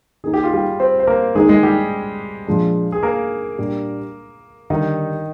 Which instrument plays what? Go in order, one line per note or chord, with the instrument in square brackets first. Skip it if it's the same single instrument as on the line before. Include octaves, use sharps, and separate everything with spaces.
[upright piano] D#3 A#3 D#4 [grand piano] G#4
[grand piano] G4
F4
G3 G4
C4 C5
C5
A#3 A#4
[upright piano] D#3 A#3 D#4 [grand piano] G#3 G#4
[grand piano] G#3 G#4
G3 G4
[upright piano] A#2 F3 G#3 D4
[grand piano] G#4
A#3 A#4
[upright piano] A#2 G3 D4
[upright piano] D3 G3 D4 [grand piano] D#3 D#4